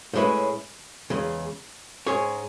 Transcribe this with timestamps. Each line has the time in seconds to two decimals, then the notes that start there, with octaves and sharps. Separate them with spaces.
0.14 A2 G#3 C#4 E4 B4
1.10 E2 C#3 G#3
2.06 G#2 G#3 C#4 G#4 C#5